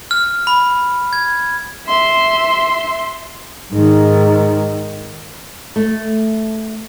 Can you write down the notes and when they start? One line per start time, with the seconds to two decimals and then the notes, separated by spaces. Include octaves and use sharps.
0.11 F6
0.47 B5
1.13 G#6
1.87 E5 C6
3.73 G#2 D#3
5.76 A3